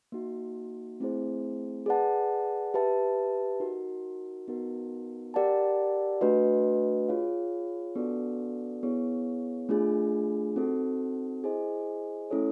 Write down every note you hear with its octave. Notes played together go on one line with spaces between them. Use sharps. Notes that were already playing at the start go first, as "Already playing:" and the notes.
A#3 D#4 F#4
A3 C4 E4 G#4 C5
G#4 B4 D5 F#5 A5
G4 B4 E5 A5
D#4 F#4 A#4
B3 D#4 F#4 A#4
G4 A#4 D5 F#5 A5
A3 D4 F#4 B4 D#5
F4 G#4 C#5 F5
B3 D4 F#4 A4 D5
B3 E4 G#4 C#5
A3 D4 F4 G#4
C4 D#4 F#4 A4
E4 G#4 C5 D#5 G#5
A3 C#4 E4 A4 C#5